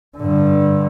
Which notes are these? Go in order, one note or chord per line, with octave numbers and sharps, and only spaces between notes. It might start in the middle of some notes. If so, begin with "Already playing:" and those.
G2 D3